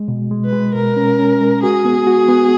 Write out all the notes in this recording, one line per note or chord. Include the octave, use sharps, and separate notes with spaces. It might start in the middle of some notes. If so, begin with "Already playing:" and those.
Already playing: G#3
B2
G#3
B4
G#3
B2 A#4
C#4
C#4
G#3
F#4 G#4
B3
F#4
B3